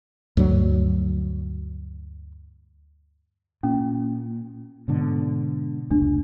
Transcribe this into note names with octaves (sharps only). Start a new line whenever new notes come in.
D2 G2 F#3
A#2 C#4
G#2 B2 D3
F1 C#2 A3 D4